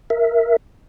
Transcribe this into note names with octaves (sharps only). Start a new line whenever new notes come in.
A#4 E5